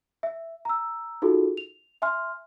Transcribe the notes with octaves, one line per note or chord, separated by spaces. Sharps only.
E5
A#5 E6
D#4 F4 F#4 G#4 A4
F7
E5 G#5 C6 F6